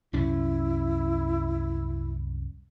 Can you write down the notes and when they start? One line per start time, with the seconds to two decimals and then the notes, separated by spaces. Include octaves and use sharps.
0.13 C2 F#2 C#4 E4